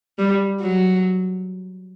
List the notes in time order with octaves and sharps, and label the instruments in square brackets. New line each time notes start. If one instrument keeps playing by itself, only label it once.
[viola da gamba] G3
F#3